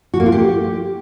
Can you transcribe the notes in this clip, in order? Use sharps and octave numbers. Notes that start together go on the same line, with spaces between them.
F#4
A#3
F4
G4